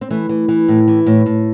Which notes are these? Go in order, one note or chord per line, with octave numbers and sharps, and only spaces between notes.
C4
E3 A3
E3
E3
A2
E3
A2
A2